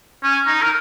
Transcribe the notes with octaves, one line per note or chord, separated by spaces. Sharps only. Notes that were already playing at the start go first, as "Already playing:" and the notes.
C#4
D#4
A#4